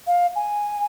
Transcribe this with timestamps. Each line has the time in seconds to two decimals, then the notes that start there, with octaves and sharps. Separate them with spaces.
0.07 F5
0.36 G#5